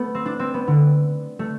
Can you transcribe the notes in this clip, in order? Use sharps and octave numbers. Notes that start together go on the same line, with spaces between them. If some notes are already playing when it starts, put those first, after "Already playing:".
Already playing: A3 B3
C4
D4
C4
B3
D3
A3